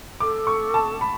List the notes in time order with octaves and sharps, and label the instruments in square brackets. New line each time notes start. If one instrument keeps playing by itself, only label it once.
[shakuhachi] A4 [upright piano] D6
[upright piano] C#6
A5
B5